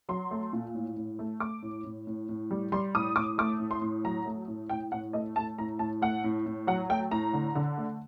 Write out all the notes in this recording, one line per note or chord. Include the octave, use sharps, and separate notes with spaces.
F#3 C6
A3
A#2
A2
A2
A3
A3 D6
A2
A2
A2
A2
G3
G3 C6
A2 D#6
A2 D6
A3 D6
A2
C6
A2
F#3 A#5
A3
A2
A2 G5
A2 F#5
A3 D#5
A3 A5
A2 A#5
A2 A5
A3 F#5
A2
A2
F#3 F#5
A3 G5
A2 A#5
D3
D3
A3